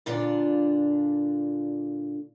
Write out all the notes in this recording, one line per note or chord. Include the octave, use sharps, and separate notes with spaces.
A#2 D3 D4 F4 A4 D5